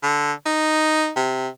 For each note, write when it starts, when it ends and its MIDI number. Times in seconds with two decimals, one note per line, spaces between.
0.03 0.33 50
0.46 1.11 63
1.16 1.48 48